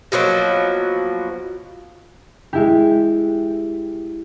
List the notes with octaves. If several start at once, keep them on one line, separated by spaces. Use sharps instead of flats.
B2 F3 F#3 A#3
G#3 E4 G4